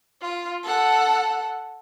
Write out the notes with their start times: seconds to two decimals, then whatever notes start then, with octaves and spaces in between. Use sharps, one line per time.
0.22 F4
0.63 A4 F#5